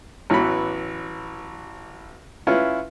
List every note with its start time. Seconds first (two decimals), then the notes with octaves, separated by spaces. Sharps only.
0.30 A1 E3 F#3 B3 B5
2.47 C#4 E4 F4 B4